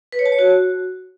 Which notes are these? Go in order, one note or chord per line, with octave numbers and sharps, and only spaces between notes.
B4
C#5
A5
C#5
F#4